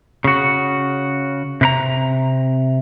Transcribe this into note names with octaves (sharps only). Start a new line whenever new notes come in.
C#3 F#4
C3 B4 A#5